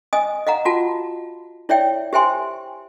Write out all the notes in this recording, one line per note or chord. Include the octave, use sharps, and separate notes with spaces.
D#5 G#5 D#6
D#5 F5 F#5 A#5
F4 F#4 F#5 A5
E4 C#5 D5 E5 G5
G4 C5 E5 G5 G#5 C6